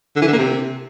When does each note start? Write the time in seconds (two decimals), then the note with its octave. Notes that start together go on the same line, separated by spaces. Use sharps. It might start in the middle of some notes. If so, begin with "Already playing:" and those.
0.16 D3
0.22 E3
0.27 D3
0.33 A#3
0.38 C3